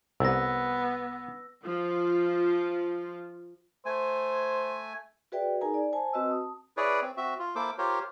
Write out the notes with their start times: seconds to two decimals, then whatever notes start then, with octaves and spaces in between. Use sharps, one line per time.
0.20 C2 B3 E6 A#6
1.65 F3 F4
3.86 A3 C5 G#5
5.32 F#4 G#4 B4 D5 E5 G5
5.61 D#4 G#4 A#4 G#5 A#5
5.74 D5
5.93 C5 G#5 A5
6.13 C4 F#4 B4 D#5 E6
6.28 A5 D#6
6.77 E4 G#4 B4 C#5 D5
7.02 C4
7.17 C4 F#4 E5
7.39 F4
7.55 A#3 E4 A4 C5 D6
7.78 F4 G4 A#4 C5 C#5